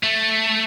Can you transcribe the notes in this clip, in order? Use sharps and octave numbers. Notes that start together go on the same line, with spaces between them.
A3